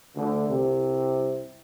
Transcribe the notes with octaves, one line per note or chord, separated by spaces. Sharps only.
D2 D3
C2 C3